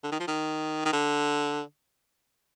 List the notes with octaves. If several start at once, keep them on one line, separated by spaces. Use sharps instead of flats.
D3
D#3
F3
D#3
D#3
D3